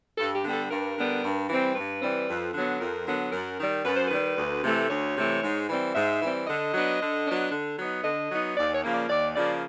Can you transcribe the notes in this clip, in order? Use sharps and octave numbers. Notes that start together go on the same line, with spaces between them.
G2 A4
G4
D3 G3 B3
A4
G2 A#4
D3 G3 B3
G2
E3 G3 C4
G2 B4
E3 G3 C4
F2
D3 F#3 B3
F2 A#4
D3 F#3 B3
F#2 A#4
D#3 G3
F#2 B4
C5
D#3 G3 B4
D2
C3 E3 A3
D2 C#5
C3 E3 A3
G#2
E3 G3 C4
G#2 E5
E3 G3 C4
D3 D#5
F#3 B3 D4
D3
F#3 B3 D4
D3
F#3 B3 D#4
D3 D#5
F#3 B3 D#4
D#2 D5
C#5
C#3 F3 A#3
D5
D#2 D5
C#3 F3 A#3 D5